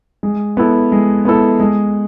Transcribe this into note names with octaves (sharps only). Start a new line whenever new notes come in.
G#3
B3 E4 A4
G#3
B3 E4 A4
G#3